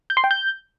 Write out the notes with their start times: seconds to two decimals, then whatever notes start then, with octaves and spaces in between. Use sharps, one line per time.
0.10 G6
0.17 C6
0.24 G5
0.31 G6